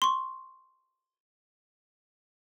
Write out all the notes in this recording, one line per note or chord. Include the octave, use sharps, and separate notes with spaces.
C6 C#6